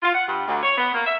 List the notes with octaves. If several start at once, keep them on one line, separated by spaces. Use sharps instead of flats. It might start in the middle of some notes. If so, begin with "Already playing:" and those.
F4
F#5
G2
D2
C#5
B3
A#3
E5